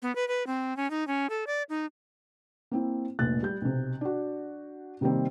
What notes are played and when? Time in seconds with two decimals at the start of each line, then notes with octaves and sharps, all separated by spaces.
0.02 B3
0.16 B4
0.28 B4
0.47 C4
0.77 C#4
0.90 D#4
1.07 C#4
1.30 A4
1.47 D5
1.69 D#4
2.71 A#3 C4 E4
3.19 F1 A#1 A#2 F#6 A6
3.43 G3 G6
3.61 B1 C3
4.01 D4 F#4
5.01 C3 D#3 G3 A#3 C4